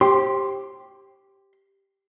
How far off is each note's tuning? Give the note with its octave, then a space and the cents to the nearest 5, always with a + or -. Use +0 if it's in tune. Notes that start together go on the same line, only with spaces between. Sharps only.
G4 +0 C5 +30 C6 +0